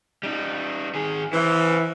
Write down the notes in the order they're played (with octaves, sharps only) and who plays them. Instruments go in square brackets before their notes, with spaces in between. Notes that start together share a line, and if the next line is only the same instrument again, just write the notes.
[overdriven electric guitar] G3 D#4
D#3 G#4
[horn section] E3 [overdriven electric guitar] E4 C5